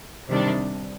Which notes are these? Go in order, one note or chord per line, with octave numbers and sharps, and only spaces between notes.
C3 D#3 G3 D4